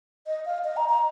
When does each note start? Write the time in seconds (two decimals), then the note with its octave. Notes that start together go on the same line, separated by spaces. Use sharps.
0.27 D#5
0.46 F5
0.64 D#5
0.77 A#5
0.89 A#5